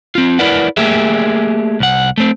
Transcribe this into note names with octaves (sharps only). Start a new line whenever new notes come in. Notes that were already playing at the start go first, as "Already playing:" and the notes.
C4 F4
E4 A#4 B4 D5 F#5
A3 A#3 G4 G#4 E5
C2 F#5
A3 C4